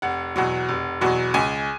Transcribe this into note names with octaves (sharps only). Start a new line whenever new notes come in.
F1 F#5
E2 B2 F#3
F1
E2 B2 F#3
C#2 G#5